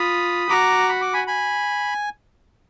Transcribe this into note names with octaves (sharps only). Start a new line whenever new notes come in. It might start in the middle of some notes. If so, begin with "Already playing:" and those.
Already playing: F4 B5 D#6
F#4 A#5 D6
B5
D6
G#5 B5
G#5 B5